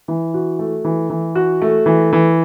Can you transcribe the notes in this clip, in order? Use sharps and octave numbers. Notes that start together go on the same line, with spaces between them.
E3
F#4
A3
E3
E3
F#4
A3
E3
E3